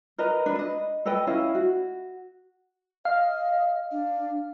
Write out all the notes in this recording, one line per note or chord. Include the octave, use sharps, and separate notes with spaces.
A#4 B4 D#5 A#5
D4 B4
D#5
A4 B4 D#5 G5
C#4 E4 D#5 F5
F#4
D#5 F5
D4